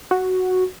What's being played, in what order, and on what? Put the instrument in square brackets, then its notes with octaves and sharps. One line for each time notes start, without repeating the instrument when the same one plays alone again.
[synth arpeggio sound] F#4